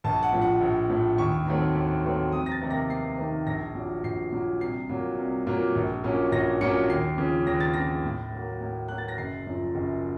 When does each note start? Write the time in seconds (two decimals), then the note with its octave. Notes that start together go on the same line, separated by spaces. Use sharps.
0.04 A#1 A5
0.23 F#5
0.32 A2 F3
0.42 F#5
0.61 A#1
0.89 A2 F3
1.18 D#2 C#6
1.47 D#3 F#3 A3 C4
1.75 D#2
2.04 D#3 F#3 A3 C4
2.32 F2 D#6
2.46 A#6
2.52 A6
2.61 C3 D#3 A#3 D#4
2.70 A#6
2.89 F2 C7
3.18 C3 D#3 A#3 D#4
3.46 A#1 A#6
3.75 A#2 F#3
4.04 A#1 C7
4.32 A#2 F#3
4.61 C2 C7
4.89 A#2 F#3 A#3
5.18 C2
5.47 A#2 F#3 A#3
5.75 A#1
6.04 A#2 F#3 A#3 C#4
6.32 A#1 A#6
6.61 A#2 F#3 A#3 C#4 C#7
6.89 D#2 C7
7.18 C#3 F3
7.46 D#2 A#6
7.60 A6
7.74 C#3 F3 A#6
8.03 A2
8.32 F#3 A#3
8.61 A2
8.88 F#3 A#3 F#6
8.98 A6
9.08 A#6
9.18 F#1 C7
9.47 F#2 F3
9.75 F#1